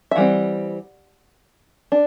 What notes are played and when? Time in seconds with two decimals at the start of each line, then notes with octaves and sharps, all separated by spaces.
0.11 E5
0.16 E3 G3 C4 F#5
1.92 D4